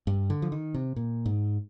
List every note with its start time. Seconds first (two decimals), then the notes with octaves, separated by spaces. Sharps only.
0.07 G2
0.30 D3
0.42 F3
0.52 D#3
0.74 C3
0.96 A#2
1.26 G#2